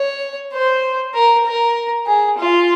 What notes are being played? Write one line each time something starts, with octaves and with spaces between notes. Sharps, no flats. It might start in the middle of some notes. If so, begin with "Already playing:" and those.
Already playing: C#5
C5
A#4
A#4
G#4
F4